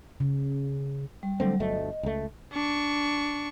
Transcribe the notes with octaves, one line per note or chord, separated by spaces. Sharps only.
C#3
G3
D3 F#3 G3 A3 C4
G1 D2 A3 D#5
C#2 A3
D4 C#6